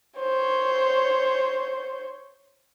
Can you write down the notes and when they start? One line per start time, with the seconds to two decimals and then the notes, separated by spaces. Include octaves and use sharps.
0.19 C5 C#5